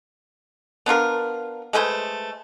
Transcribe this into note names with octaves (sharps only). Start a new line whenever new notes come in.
B3 D4 F4 A#4
G#3 A3 B4 C5